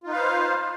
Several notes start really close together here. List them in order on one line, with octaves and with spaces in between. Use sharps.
F4 D#4 B4 F5 C5